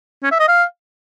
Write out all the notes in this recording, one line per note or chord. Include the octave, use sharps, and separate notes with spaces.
C#4
E5
D#5
F5